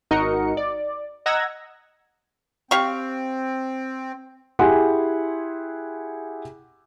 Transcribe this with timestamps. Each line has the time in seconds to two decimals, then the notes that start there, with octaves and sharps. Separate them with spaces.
0.11 G#1 D#4 F#4 A#4 D#5 C#7
0.57 D5
1.26 D#5 F#5 A#5 E6 G#6 A#6
2.71 C4 G4 F5 C#6
4.59 E4 G4 G#4 F#5 G#5 C6